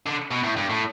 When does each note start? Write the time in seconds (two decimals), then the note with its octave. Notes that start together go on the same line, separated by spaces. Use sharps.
0.06 D3
0.31 B2
0.43 A2
0.56 G2
0.70 A2